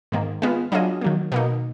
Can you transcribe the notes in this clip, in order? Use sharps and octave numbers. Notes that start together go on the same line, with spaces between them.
G#2 D#3 A#3
G#3 B3 F4 B4
F#3 D4 F4 G#4 D#5
D#3 F#3 A#3
B2 A#3 D#4